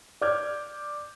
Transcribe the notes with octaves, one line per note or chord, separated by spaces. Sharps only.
D5 D6 F6 G6 G#6